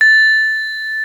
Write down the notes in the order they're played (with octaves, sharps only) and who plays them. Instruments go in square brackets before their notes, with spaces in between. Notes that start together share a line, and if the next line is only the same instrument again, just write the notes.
[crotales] A6